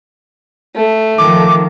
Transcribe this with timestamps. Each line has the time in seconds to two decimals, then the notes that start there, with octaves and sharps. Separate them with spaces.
0.76 A3
1.18 D#3 F3 D6